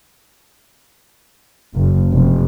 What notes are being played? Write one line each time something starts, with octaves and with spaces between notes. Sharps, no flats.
F#1
F1